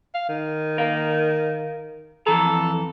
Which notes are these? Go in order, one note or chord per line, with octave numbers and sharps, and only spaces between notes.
F5
D#3
A#4 F5
F2 E3 A4 A#5